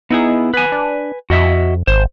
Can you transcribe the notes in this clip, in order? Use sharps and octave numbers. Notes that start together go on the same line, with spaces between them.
B3 D#4 E4 G#4
B3 B4 G#5
D4
F2 F#4 D#5 E5
G#1 C5